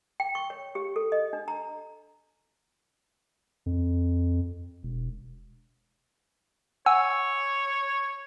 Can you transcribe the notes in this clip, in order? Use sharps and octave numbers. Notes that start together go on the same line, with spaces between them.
G5
C#6
C#5
G4
A4
D#5
D4
A#5
F2
E1
C#5 F#5 G#5 E6